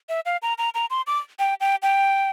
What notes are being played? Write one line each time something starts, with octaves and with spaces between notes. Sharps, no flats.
E5
F5
A#5
A#5
A#5
C6
D6
G5
G5
G5